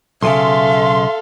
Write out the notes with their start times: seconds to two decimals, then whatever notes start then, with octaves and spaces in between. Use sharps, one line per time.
0.22 B1 A2 C#3 A4 E5 F5 C6